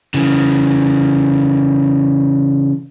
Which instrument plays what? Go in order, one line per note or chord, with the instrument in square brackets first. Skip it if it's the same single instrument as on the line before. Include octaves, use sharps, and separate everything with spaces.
[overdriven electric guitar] C#3 E3